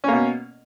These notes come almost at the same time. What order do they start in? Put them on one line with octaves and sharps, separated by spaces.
C#4 A#3 B2